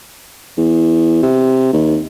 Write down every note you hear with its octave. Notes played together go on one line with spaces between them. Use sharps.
E2
C3
D#2